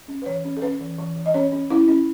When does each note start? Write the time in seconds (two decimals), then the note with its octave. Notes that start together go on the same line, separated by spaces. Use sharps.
0.08 C#4
0.22 B4
0.26 E3 C#5
0.44 C#4
0.57 A4
0.62 C#4 B4
0.81 E3
0.98 E3
1.16 E3
1.26 D#5
1.34 C#4 C#5
1.52 C#4
1.70 C#4 E4
1.88 C#4